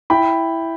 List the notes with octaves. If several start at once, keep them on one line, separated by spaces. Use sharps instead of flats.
E4 G5 B5